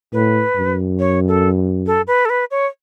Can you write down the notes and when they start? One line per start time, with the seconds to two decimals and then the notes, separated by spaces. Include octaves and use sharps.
0.13 A2 B4
0.56 F#2
0.99 C#5
1.28 A4
1.86 A4
2.07 B4
2.25 A4
2.30 B4
2.51 C#5